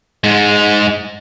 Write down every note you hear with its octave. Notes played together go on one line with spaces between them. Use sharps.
G#2 G#3